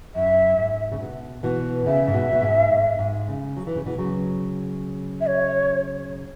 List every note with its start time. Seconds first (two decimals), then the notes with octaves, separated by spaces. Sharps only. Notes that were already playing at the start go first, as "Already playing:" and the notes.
0.15 F#2 E5
0.58 G#2
0.92 C#3
1.00 B2
1.43 B2 E3
1.86 C#3 E5
2.08 G#2
2.14 B2
2.32 B2
2.42 G#2
2.72 G#2
2.99 G#2
3.29 C#3
3.57 F#3
3.67 E3
3.76 C#3
3.86 B2 E3
3.98 C#3 F#3
5.20 E5
5.27 C#5